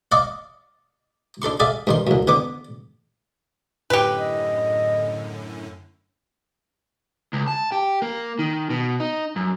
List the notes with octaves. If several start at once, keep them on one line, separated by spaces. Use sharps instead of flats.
D5 D#5 F5 C#6 D6
D4 A4 C6 C#6
G#4 A4 D5 E5 F5
G2 D#3 C6
C2 F#2
D3 B3 D6
F#2 A2 D3 G4 B4
D#5
C#2
A5
G4
A#3
D#3
B2
D#4
F#2